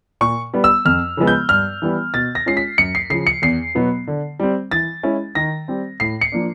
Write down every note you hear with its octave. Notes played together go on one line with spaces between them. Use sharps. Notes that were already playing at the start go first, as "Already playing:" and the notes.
A#2 C#6
G3 B3
E6
F2 F6
C#3 F3 G#3 B3
G6
G2 F6
E3 G3 B3
B2 A6
A#6
G#3 C#4 F4 C7
B6
F#2 C#7
C7
C#3 F3 C7
C#7
E2 C7
B2 F#3 B3
D3
G3 C4
E3 A6
G#3 C#4 E4
D#3 A#6
G3 C4
A2 C7
C#7
F3 A#3 D4